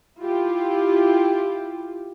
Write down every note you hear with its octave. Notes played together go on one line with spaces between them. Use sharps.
E4 F4 G4